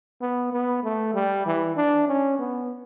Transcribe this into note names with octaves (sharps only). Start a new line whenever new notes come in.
B3
B3
A3
G3
E3
D4
C#4
B3